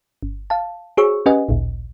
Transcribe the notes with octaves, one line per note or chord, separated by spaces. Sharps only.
G1
F5 A5
F#4 G#4 C5 C#5 C#6 E6
C#4 G4 B4 D#5 F#5 G#5
A1 D2 A#2